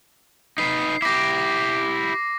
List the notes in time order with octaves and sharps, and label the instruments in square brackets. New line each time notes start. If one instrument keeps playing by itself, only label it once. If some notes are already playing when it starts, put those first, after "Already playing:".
[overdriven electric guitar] D#4 B4 [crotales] C7
[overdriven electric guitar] E4 G4 [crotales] D6 A#6